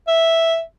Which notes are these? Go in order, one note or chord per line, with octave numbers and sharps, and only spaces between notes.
E5